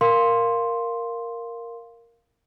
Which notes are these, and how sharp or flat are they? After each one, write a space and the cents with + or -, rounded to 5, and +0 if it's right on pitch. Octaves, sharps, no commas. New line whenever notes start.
A#4 +0 F5 +0 C6 +0